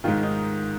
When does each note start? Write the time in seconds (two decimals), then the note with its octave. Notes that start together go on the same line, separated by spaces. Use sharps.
0.04 D#3 F4
0.08 G#2
0.23 D#4